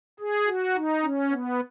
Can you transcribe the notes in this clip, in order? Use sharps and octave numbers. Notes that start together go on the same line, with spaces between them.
G#4
F#4
D#4
C#4
B3